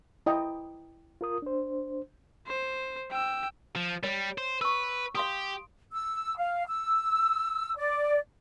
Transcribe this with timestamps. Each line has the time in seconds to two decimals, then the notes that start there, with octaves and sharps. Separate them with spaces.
0.26 E4 D#5 G5
1.21 F4 A#4 D#6
1.42 D4 C5
2.47 C5
3.11 G5 E6
3.76 F3
4.03 G3 C#5
4.38 C5
4.61 B4 C#6 E6
5.15 G4 F5 C6 D#6
5.92 E6
6.37 F5
6.67 E6
7.77 D5